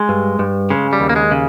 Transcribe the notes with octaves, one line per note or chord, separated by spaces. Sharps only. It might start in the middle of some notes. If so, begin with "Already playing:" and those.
Already playing: G#3
G2
G2
C#3 G#3
G3
D#2
A#3
G#3
C#3